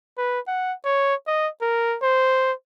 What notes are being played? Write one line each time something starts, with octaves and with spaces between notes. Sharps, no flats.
B4
F#5
C#5
D#5
A#4
C5